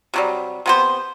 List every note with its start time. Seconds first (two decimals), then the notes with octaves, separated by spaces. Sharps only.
0.14 C3 F#3 G3
0.66 C3 B3 C5